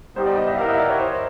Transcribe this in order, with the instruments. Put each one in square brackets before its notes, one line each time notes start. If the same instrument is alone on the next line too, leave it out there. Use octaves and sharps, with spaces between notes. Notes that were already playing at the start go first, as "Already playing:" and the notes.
[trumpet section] G3 B3 D#4 G4 [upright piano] C5
[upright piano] D5
D#5
E5
[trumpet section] E4 G4 A#4 D#5 F#5 [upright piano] F5
[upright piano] E5
D5
C#5
C5